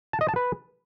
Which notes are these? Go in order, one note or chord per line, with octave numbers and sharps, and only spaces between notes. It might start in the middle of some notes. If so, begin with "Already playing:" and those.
A5
D#5
A5
B4